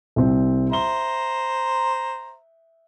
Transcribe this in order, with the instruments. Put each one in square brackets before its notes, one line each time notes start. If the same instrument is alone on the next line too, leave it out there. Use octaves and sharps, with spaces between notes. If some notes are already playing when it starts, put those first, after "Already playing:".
[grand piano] C2 C4
[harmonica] C5 A#5 [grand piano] E5 G7